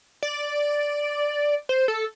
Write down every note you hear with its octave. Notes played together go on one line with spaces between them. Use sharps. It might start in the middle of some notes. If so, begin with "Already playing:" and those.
D5
C5
A4